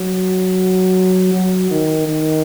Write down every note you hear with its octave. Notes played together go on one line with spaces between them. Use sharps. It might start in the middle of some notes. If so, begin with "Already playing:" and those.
Already playing: F#3
F#3
D#3
D#3